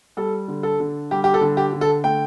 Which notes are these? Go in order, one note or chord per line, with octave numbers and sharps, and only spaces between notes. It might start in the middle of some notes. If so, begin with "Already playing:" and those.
G3 A4
D3
A4
D3
G3 G4
G4
A4
D3
G4
D3
A4
A3 G5